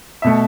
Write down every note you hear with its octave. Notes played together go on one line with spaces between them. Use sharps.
B2 A3 E5